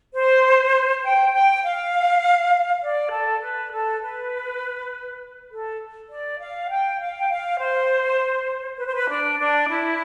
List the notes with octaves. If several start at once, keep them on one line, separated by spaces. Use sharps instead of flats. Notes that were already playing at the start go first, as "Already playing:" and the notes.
C5
G5
G5
F5
D5
A4
B4
A4
B4
A4
D5
F5
G5
F5
G5
F5
C5
B4
C5
B4
D4
D4
E4